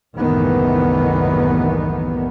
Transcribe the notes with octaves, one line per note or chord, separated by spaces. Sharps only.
F#1 C2 A2 D#3 E3 B3